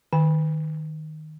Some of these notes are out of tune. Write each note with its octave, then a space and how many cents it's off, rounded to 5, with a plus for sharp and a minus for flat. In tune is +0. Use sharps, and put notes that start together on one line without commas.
D#3 -5 G#5 -40